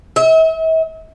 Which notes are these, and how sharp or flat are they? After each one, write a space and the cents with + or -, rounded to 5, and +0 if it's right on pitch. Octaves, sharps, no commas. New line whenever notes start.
E5 -40